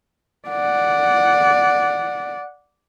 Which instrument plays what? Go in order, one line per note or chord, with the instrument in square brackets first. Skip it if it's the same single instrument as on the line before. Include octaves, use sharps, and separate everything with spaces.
[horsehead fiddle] D5 F#5